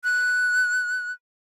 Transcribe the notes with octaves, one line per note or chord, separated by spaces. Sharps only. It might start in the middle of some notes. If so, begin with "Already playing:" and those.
F#6